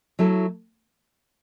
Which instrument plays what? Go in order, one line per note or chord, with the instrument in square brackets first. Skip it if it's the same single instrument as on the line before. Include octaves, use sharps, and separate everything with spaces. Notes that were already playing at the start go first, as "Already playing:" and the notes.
[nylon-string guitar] F#3 A3 E4 A4